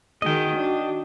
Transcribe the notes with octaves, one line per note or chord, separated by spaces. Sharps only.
D#3 G#3 F#4 D#5 G5
D4